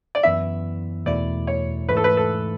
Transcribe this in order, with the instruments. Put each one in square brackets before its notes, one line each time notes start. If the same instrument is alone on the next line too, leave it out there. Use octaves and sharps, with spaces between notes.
[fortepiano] D5
[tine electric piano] F#2 E3 B3 E4 [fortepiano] E5
[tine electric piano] E2 B2 A3 E4 [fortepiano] D5
[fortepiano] C#5
[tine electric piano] G#2 E3 A3 [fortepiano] B4
[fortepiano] A4
B4
A4